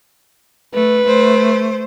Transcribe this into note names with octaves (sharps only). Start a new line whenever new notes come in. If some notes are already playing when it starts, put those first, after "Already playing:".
A3 B4
A3 C5